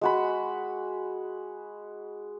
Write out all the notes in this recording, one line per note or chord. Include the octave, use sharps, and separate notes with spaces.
G#3 F#4 B5